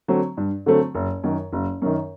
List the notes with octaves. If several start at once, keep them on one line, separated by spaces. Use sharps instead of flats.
D3 F#3 A3 C4
G2
D3 F#3 A3 C4
F#1
F#2 D#3
F#1
F#2 D#3